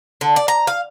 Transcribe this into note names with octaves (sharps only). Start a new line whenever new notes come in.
D3
D5
A#5
F5